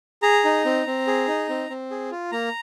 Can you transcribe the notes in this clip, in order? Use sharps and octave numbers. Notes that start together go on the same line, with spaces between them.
G#4 A#5
D#4
C4
C4
G#4
D#4
C4
C4
G#4
F4
A#3 A#5